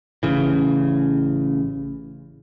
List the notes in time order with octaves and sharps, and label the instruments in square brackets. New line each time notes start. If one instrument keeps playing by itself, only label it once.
[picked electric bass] A1 C#3 E3